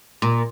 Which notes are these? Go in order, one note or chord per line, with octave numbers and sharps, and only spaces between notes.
A#2